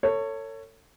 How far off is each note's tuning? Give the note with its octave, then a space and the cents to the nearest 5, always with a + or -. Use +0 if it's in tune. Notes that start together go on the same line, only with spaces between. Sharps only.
A4 +35 C#5 +0